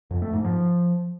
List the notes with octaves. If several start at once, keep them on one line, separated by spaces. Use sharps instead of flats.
F2
A3
G#2
F3